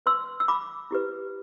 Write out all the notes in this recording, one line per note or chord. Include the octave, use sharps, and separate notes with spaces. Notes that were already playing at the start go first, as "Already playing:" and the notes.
F#4 B4 C6 E6
E6
B5 D6
E4 G4 B4